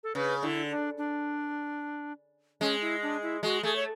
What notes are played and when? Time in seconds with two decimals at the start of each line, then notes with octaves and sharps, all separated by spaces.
0.03 A4
0.15 C#3 B4
0.43 D3 E4
0.71 D4
0.98 D4
2.61 G#3 C#4
2.82 E4
3.02 D4
3.23 E4
3.43 G#3 F#4
3.63 A3 G#4
3.76 C#5